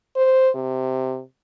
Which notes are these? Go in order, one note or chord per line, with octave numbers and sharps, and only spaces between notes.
C5
C3